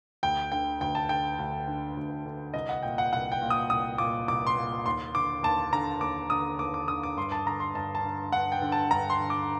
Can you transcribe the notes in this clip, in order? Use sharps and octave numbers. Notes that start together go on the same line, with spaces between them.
D2 G5
D3 G5
D2 G5
A5
D3 G5
D2
D3
D2
D3
C2 D#5
F#5
A#2 G5
F#5
C2 F#5
G5
A#2
D#6
C2 D#6
A#2 D6
C2 D6
C6
A#2
D#2 C6
D3 D6
D#2 A5
D3 A#5
D#2 D6
D3 D#6
D#2 D6
D6
D3 D#6
D6
G2 C6
A5
D3 A#5
C6
G2 A5
A5
D3
G2 F#5
G5
D3
A5
G2 A#5
C6
D3
D6